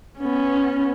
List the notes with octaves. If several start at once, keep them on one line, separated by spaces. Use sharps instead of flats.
B3 C#4